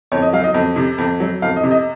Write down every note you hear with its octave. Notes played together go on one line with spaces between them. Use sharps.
F2 C#5
D#5
F#3 F5
D#5
F2
C3
F2
F#3
F2 F5
D#5
C3
D#5